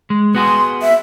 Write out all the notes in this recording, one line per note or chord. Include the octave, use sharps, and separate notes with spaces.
G#3
B3 F#4 G#4 C6
E5